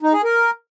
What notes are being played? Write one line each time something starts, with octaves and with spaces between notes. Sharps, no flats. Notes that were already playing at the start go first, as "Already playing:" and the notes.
D#4
G#4
A#4